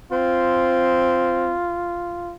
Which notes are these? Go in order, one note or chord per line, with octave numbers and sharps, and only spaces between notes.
C4 F4